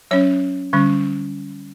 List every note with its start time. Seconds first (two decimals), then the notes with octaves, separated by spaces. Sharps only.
0.11 F#3 C#4 C#5
0.73 D3 G3 C#4